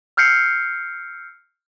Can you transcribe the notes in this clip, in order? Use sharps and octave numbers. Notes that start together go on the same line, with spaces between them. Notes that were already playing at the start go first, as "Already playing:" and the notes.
E6 F6 G6 C7 C#7